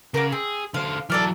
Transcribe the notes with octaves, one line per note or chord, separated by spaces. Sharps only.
C#3 A#4 F#5 D6
C4 G#4
D3 C5 F5
E3 F#3 A4 D5 F6